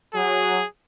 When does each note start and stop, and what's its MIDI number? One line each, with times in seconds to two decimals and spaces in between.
0.15 0.59 54
0.15 0.67 68